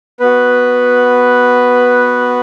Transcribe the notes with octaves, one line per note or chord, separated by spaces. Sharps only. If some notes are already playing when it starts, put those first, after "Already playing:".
B3 F#4 B4